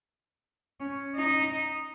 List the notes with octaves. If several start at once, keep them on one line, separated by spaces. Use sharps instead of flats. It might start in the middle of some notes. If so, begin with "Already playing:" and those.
C#4
D#4